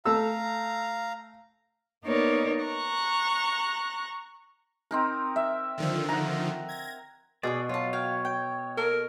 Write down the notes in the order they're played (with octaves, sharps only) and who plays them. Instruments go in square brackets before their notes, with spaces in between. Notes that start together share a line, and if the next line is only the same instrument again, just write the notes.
[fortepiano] A3 A4 E6 [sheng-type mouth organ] F5 A#5
[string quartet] A#3 B3 D#4 A#4 C#5 D5
A#5 C#6 F#6
[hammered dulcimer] C4 D#4 A#4
E5
[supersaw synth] D3 D#3 F3
[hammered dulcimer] F#5 A#5
[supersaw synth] G#6 A#6
[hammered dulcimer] B2 [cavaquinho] G#4 C#5 [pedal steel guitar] D5
[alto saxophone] F#3 [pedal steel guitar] F4 [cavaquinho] C#5 A5
[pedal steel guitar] C#5 [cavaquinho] F5 G5
[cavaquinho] G5
[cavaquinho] A4 [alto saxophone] A#4